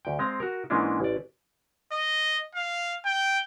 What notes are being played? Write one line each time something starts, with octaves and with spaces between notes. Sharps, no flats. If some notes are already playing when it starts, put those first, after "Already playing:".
D2 G5
G#3 C4 F5 A#5
F#4 A#4
G#2 E3 G#3 A#3 C#4 D4
A1 D5
D#5
F5
G5